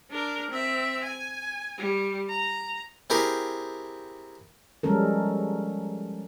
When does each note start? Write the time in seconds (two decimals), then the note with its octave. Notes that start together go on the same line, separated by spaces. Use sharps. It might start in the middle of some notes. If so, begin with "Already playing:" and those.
0.10 D4 A#4
0.51 C4 E5
1.04 G#5
1.78 G3
2.29 A#5
3.10 C4 E4 G4 G#4 A#4
4.83 F3 G3 G#3 C#4 A4 A#4